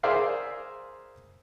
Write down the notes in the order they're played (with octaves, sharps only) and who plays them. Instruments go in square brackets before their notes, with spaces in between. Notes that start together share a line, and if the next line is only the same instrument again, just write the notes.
[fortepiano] G#4 A#4 C5 D5 E5 F5